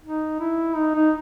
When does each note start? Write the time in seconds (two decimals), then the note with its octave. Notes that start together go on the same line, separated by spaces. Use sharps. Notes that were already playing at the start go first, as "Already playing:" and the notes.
0.03 D#4
0.40 E4
0.76 D#4
0.95 D#4